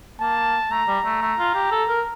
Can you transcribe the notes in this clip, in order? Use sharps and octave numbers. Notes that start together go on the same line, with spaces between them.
A#3 A5
A3 A#5
G3
A3
A3
F4
G4
A4
A#4